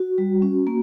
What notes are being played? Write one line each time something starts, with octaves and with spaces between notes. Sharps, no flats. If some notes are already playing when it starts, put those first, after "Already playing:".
Already playing: F#4
G3
C#4
A#3